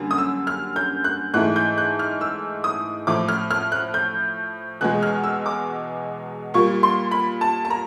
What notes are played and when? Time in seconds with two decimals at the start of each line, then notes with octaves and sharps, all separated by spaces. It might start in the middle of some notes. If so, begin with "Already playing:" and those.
Already playing: F#2 D3 G3 A#3
0.11 D#6
0.18 E6
0.47 F6
0.76 G6
1.04 F#6
1.34 G#2 E3 A3 F#6
1.56 G6
1.78 F#6
1.99 F6
2.21 E6
2.64 D#6
3.07 A2 F3 A3 D6
3.28 F6
3.51 F6
3.72 F#6
3.94 G6
4.81 E2 B2 G#3 F#6
5.03 F6
5.24 E6
5.46 D6
6.54 A#2 G3 A#3 C#6
6.83 C6
7.11 B5
7.41 A5
7.65 A5
7.70 A#5